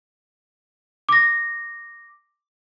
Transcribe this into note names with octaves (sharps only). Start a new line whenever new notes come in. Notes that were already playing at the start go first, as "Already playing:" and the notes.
D6 A#6